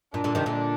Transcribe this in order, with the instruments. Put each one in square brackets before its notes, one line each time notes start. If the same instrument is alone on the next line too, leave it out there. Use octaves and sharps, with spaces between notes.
[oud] A#2 [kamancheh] D4
[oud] A#2 D3
C3 D#3
A#2 D3